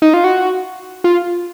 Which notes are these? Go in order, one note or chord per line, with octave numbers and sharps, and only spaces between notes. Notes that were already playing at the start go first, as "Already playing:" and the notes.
D#4
F4
F#4
F4